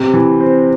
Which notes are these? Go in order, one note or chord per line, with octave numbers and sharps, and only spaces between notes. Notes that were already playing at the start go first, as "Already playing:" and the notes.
Already playing: C3
E3
C4